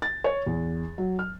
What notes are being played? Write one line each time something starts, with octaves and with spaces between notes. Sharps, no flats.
A6
C#5
E2
F#3
F6